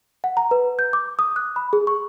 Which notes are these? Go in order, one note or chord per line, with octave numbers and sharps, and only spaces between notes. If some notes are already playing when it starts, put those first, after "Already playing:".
F#5
A#5
B4
G6
D6
D#6
F#6
B5
G#4
C#6